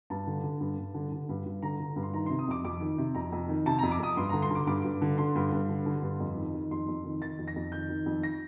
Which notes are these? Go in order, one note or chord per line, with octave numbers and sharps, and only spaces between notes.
G2 A5
D3
D3
G2
G2
D3
D3
G2
G2
D3 A#5
D3
G2
C6
D#3 A#5
C3 C6
D#6
F2 D6
F2 D6
D#3
C3
F2 A#5
F2
D#3
C3 A5
A#5
F2
D6
F2 D#6
G2 C6
D3 A#5
C6
D3 D6
G2 D6
G2
D3
D3 C6
G2
G2
D3
D3
G2
F2
D#3
D#3
F2 C6
F2
D#3
D#3 A6
F2
A#6
F2
D#3 G6
D#3
F2
A#6